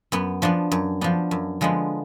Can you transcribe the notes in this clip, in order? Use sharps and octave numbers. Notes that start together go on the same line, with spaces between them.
F#2 B3
F3 B3 D4
F#2
F3 B3 D4
F#2
D3 F3 G#3 B3